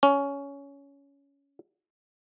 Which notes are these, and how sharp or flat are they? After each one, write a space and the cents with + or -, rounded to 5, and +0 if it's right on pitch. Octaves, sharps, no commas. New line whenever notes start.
C#4 +15